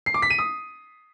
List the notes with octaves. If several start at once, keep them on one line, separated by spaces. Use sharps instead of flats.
C7
D6
B6
D#7
D#6